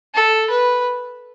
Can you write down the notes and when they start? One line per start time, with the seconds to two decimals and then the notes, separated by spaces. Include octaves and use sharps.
0.14 A4
0.50 B4